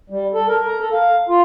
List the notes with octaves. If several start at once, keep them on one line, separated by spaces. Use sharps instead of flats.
G3
A4
A#4
A#5
A4
F5
F4